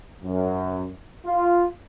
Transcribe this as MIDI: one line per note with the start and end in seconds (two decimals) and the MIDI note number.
0.24 0.87 42
1.26 1.64 65